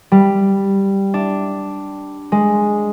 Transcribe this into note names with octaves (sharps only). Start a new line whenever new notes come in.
G3
D4
G#3